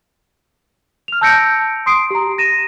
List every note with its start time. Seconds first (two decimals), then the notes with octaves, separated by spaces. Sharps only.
1.08 F6 F7
1.21 A5 E6 G6 A#6 C#7 D7
1.86 C6 D#6 C7 D7
2.11 G4 A#5
2.38 A#6 D#7 E7